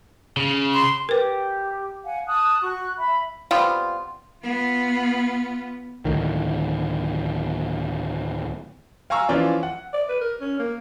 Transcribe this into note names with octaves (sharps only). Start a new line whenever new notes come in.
C#3
C6
G4 A#4 B4
F5 F#5 G#5
A5 D#6 F#6
F#4 C#6 F#6
E5 B5
G3 B3 C4 F4
B3 F4
D2 A2 D#3
F5 G#5 A#5 C#6 E6
E3 F3 C#4 F4 D5
F#5
D5
B4
A#4
C#4
A#3